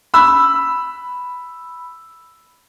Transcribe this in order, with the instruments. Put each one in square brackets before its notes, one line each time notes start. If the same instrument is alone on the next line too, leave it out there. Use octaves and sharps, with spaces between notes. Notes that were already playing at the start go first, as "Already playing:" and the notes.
[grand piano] B5 E6